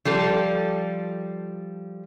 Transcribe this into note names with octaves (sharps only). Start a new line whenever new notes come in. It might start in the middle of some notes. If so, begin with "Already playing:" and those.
F3 G3 A4